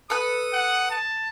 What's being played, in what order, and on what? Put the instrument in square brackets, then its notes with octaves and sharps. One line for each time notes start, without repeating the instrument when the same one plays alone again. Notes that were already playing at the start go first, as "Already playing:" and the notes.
[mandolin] A4 B4 F#6 [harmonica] D#6
[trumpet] F#5
A5